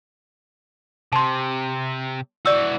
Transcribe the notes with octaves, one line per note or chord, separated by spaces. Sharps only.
C3 A5 C6
E3 F#4 D5 E6